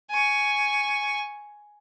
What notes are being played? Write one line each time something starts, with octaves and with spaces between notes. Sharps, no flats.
G#5 C#6